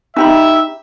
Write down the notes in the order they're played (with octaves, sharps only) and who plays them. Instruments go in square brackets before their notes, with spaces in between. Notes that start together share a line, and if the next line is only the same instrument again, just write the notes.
[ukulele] D#4 G4 B5 [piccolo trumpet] E5